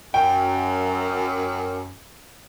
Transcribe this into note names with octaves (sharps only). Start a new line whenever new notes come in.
F#2 G5